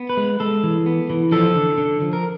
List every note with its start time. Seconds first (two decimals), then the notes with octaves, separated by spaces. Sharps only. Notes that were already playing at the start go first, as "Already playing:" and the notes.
Already playing: B3
0.09 B4
0.17 G#3
0.40 G#3 A4
0.63 E3
0.86 B3
1.10 E3
1.32 F3 A4
1.55 D3
1.78 D3
2.02 F3
2.13 A#4